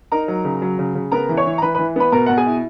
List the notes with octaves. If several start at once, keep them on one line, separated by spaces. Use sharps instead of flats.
D#4 A#4 A#5
F#3
C#3
F#3
C#3
C#3
B3 A#4 A#5
E3
C#5 C#6
E3
A#5
E3 B4 B5
B4 B5
E3
B3 B4 B5
B2 A#4 A#5
B2 F#5
G#4 G#5
E4